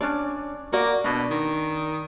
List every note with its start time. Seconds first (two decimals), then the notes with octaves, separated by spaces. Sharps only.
0.01 C#4 D4 D5
0.72 A#3 F#4 D5
1.04 B2 D4
1.30 D#3